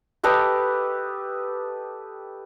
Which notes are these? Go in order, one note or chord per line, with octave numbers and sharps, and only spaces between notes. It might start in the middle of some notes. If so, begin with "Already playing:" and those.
G4 A4 B4 D#5